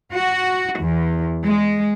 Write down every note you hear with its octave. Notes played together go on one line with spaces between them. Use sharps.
F#4
E2
G#3